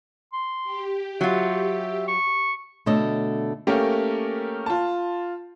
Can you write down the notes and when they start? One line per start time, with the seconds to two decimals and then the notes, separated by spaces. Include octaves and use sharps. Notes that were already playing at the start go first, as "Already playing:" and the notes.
0.33 C6
0.64 G4
1.21 F#3 F4 E5
2.08 C#6
2.86 B2 D3 A3 C#5 D#5
3.67 A3 A#3 C#4 G4 A#4
4.66 F4 A5